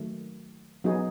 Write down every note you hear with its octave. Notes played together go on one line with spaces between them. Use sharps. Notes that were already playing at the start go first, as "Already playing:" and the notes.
Already playing: D#3 F#3 A3
F#3 B3 D#4 G#4